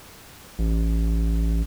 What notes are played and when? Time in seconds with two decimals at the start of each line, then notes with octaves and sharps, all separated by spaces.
0.59 A1